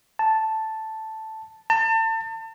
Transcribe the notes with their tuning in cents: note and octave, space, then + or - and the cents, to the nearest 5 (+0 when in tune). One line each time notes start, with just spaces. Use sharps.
A5 +0
A5 +35